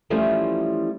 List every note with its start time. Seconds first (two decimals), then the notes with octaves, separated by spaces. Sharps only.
0.10 E3 F3 G3 A3 C#4 F4